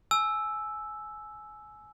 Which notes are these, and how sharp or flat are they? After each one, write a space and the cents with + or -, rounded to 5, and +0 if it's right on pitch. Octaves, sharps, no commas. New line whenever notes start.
G#5 +25 E6 +0